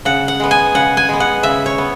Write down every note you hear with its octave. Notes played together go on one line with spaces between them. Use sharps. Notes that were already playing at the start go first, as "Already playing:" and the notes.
C#3 F#5
F#5
G#3 B3
G#5
C#3 F#5
G#5
G#3 B3
F#5
C#3 E5
C#5
B3